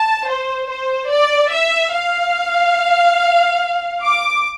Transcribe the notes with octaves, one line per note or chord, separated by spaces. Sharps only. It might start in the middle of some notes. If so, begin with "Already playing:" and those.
Already playing: A5
C5
C5
D5
E5
F5
D6